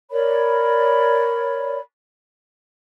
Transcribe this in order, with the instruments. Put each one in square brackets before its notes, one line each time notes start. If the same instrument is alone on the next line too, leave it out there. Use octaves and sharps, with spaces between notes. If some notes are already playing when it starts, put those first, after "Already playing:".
[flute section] A#4 C#5 D5 B5